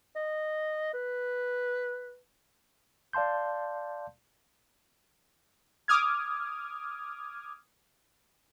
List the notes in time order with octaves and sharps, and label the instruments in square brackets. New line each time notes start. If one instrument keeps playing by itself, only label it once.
[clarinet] D#5
B4
[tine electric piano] D5 F5 A5 C6 G6
[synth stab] D6 D#6 F6 G#6